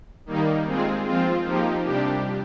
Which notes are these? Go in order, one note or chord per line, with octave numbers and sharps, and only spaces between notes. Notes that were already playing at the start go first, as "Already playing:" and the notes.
D#3 G3 A#3 D#4
G#3 C4 F4 G#4
F3 C4 F4
F3 A#3 D#4 G4
C3 G3 D4 G4